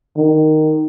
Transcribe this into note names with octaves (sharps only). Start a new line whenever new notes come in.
D#3